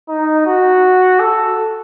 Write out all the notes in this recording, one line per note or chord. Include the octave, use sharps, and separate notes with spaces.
D#4
F#4
A4